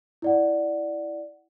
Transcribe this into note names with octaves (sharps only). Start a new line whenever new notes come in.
E4 D5 F#5